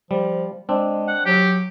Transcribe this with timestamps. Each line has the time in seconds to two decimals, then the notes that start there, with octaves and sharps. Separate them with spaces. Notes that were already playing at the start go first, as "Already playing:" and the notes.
0.11 F3 G3
0.69 G#3 C4 D4
1.08 F#5
1.26 F#3 G4